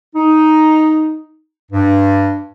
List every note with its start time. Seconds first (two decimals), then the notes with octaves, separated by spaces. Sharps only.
0.16 D#4
1.71 G2